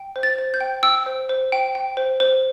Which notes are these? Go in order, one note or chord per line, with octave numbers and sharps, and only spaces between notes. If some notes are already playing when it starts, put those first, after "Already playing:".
Already playing: G5
C5
A6
C5
G6
G5
G5 E6
C5
C5
G5
G5
C5
C5